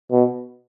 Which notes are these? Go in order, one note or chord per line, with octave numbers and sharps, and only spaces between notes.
B2